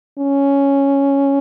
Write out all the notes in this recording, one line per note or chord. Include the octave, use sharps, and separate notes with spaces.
C#4